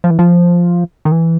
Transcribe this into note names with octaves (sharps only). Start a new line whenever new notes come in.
F3
E3
F3
D#3
E3